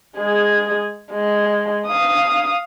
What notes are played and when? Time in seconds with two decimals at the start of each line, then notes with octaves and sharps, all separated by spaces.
0.17 G#3 G#4
1.12 G#3
1.87 F5 D#6